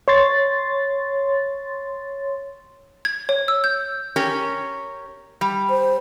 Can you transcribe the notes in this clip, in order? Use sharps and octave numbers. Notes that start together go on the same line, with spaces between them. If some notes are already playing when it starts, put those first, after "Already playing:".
C#5 C6 A6
G#6
C#5
E6
G6
C#4 G4 A#4
G3
C5